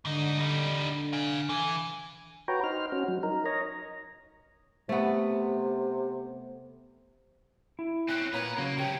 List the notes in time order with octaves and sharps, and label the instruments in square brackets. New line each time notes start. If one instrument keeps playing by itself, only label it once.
[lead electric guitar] G#2 D#4 [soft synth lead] D3
[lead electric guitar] G3 D#4
F5 G#5
[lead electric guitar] E3 [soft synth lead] G#5
[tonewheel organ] F#4 B4 C#5 G5 A#5
D#4 C5 F6
C#4 F#4
F#3
D#4 A#4
C#5 D#5 A#5
[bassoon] C3 [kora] A3 B3
[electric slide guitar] E4
[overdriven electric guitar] C4 C#4 [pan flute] F#6
[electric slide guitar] A#2 A#3 A#5 [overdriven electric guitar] B3 B4 [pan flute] C#5
[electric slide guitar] C#3 F#3 [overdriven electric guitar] A#3
[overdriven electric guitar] C3 C#4 [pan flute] G5